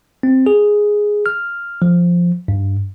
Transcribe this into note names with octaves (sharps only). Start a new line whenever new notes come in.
C4
G#4
F6
F3
G2